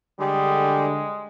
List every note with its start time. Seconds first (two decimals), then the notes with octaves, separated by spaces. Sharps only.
0.20 D3 G3 G#3 G4 G#4